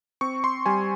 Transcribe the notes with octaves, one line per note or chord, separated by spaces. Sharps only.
C4 C#6
C6
G3 G#5